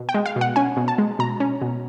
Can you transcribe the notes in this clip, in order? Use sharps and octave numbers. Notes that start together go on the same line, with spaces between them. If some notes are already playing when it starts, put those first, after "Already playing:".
Already playing: B2
G5
G#3
F5
B2
F#5
C#4 G#5
B2
A5
G#3
B2 A#5
C#4
B2